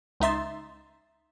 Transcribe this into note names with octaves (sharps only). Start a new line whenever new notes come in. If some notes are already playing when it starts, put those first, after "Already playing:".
C#2 D#4 E5 C6 A6